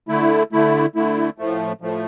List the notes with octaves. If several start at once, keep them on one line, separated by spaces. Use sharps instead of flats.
D3 A3 E4
D3 A3 E4
D3 A3 E4
A2 F3 A3
A2 F3 A3